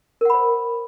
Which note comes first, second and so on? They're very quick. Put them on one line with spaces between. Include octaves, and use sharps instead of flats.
A#4 F#5 B5 C5